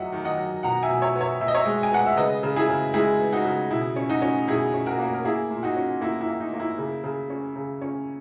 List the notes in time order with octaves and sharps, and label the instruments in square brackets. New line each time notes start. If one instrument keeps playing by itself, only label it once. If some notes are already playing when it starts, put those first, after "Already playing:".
Already playing: [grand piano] E2 F#3 D#5 E5 F#5
D#3
D#5 F#5
F#3
B2 F#5 A#5
E5 G#5
B2
C#5 E5
B3
C#5 E5
B2 E5
D#5
C#5 E5
G#3
G#5
B3 F#5
E5
C#3 B4 D#5
C#3
E4 G#4
C#3
G#3 E4 G#4
B3
D#4 F#4
C#3
B2 E4
C#4
D#4 F#4
C#4
B2 E4 G#4
C#4
F#4 A#4
A#3
A#4
A#3 E4 G#4
A#2
D#4 F#4
C#4
A#3 E4
E4
A#3
D#4
A#3
E4
C#3
C#3
C#4
C#3
C#4